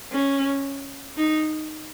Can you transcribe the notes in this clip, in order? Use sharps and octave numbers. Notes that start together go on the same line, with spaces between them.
C#4
D#4